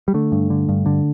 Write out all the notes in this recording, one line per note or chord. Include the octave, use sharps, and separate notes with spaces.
G3
D3 A3
G2
D3
G2
D3